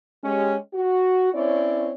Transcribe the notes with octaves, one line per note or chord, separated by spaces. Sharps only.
G#3 C#4 G4
F#4
C4 C#4 E4 C#5 D5